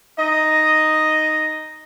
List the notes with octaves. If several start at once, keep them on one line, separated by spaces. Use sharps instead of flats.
D#4 D#5